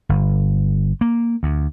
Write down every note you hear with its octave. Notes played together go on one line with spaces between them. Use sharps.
G1
A#3
D2